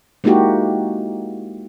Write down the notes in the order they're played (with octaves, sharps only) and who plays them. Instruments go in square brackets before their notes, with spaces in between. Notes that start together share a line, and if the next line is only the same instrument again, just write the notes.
[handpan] G#3 A#3 D#4 E4 F#4 G4